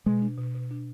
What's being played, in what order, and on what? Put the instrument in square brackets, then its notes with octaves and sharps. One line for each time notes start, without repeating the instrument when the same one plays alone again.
[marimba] B2 [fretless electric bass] G#3
[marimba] D4
B2
B2
D4